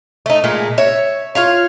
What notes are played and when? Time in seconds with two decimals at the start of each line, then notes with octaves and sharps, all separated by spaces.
0.26 A3 D#4
0.44 A#2 G#3 A3
0.78 C#5 E5
1.35 F4 C#5 F5